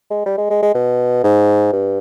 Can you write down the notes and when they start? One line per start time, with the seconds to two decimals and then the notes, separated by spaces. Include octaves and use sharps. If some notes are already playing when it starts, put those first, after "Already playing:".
0.10 G#3
0.26 G3
0.38 G#3
0.50 G#3
0.62 G#3
0.74 B2
1.23 G#2
1.72 G2